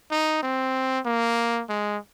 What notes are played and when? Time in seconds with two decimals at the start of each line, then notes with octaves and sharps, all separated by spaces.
0.11 D#4
0.43 C4
1.06 A#3
1.69 G#3